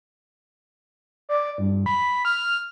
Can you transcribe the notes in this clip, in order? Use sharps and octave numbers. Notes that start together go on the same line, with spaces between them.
D5
G2
B5
F6